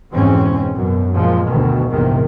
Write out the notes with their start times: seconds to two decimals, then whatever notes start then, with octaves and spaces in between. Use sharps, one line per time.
0.12 F2 G#2 B2 E3 C4 C#4
0.75 F#2 B2
1.14 A#2 F3 G#3
1.46 D2 B2 D#3
1.91 A#1 E2 G#2 C3 D#3